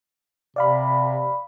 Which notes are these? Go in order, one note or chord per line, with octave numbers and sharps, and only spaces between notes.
C3 D5 F5 B5